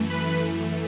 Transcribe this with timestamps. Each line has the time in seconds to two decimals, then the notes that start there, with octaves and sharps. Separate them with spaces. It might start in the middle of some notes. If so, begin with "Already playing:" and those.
Already playing: F#2 E3 A3
0.10 B4 B5